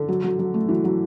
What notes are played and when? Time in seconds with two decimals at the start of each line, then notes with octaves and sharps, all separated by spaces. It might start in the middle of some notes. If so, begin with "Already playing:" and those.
Already playing: D3 A4
0.09 F#3
0.24 F#3
0.39 F#3
0.54 A3
0.68 E3 F#3
0.84 F#3